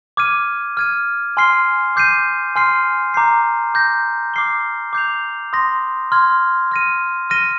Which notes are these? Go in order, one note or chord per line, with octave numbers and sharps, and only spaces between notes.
D6 F6 G#6 D#7
F6 G#6 D#7
G#5 C6 F6 C7 G7
D6 G6 C7 D#7
G#5 C6 F6 C7
A#5 D6 G6 C7
D6 G6 A#6
D6 F6 C7 G7
D6 G6 C7 F7
C6 D#6 A#6
C6 F6 G#6
F6 A#6 D#7
F6 A#6 D#7 G7